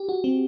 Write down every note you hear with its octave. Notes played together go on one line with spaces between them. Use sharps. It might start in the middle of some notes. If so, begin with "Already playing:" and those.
Already playing: G4
F#4
C4